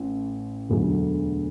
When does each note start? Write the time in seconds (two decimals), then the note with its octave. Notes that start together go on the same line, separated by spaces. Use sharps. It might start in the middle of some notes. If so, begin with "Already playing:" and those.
Already playing: A1
0.70 E1 D2 D3 F#3